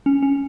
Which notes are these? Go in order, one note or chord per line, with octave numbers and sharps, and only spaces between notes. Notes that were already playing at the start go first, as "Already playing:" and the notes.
C#4
C#4